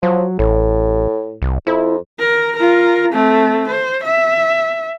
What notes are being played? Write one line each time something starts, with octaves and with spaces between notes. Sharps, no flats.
F3 F#3
A1 A2
C2
F2 E4
A#4
F4 A#4
A3 C4
C5
E5